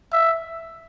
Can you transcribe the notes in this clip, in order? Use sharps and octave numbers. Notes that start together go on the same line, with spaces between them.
E5